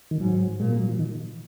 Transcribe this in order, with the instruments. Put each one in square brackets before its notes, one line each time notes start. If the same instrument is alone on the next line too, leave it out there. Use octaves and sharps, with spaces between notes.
[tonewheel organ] D#3
[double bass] G#2 [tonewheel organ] F#3
[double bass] A#2 [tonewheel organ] G#3
[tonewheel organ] A#3
F#3
F3
D#3